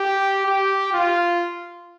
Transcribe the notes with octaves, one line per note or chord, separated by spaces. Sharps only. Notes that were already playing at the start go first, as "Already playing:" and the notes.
Already playing: G4
G4
F4